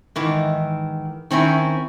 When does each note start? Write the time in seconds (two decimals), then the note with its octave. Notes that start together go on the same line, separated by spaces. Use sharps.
0.16 G#2 D#3 E3
1.31 D#3 C4 C#4 E4